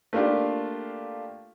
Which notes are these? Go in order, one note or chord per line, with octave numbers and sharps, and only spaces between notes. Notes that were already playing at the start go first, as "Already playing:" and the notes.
A3 A#3 D4 F4 G4